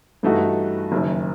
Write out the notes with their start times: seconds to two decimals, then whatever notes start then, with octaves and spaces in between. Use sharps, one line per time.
0.23 G2 E3 A3 D#4 F#4
0.92 F#1 F#2 D#3